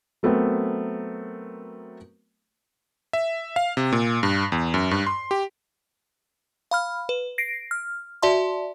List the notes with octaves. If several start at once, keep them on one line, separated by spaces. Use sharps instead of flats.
F#3 A3 B3 C4 A#4
E5
F5
C3
A#2
G2
E2
F#2
G2
C6
G4
F5 B5 F6
B4
A#6 C7 D7
F6
F#4 D5 E5 A5 C6